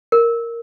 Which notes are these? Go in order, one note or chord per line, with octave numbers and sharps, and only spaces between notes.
A#4